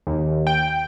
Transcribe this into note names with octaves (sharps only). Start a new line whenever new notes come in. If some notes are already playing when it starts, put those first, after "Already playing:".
D#2
G5